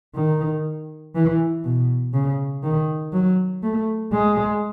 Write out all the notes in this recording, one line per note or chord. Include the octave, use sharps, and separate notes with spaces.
D#3
E3
B2
C#3
D#3
F#3
A3
G#3